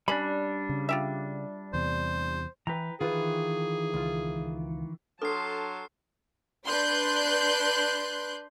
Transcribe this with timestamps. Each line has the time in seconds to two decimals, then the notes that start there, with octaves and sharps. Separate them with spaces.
0.08 G3 C#4 D4 B5
0.69 C#3
0.89 F4 G4 E5
1.74 E2 C3 C5
2.67 E3 B4 G5 A#5
3.01 D#3 E3 F4 G#4 B4
3.94 C#2 F4
5.22 F#3 D4 A4 A5 C6 F6 C7
6.66 D4 B4 C6 F#6 G6